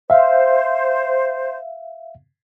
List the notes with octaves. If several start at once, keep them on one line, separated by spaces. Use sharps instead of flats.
C5 E5 F5